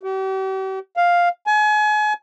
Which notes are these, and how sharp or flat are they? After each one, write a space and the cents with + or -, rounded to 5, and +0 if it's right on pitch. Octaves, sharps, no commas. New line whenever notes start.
G4 -40
F5 +5
G#5 +35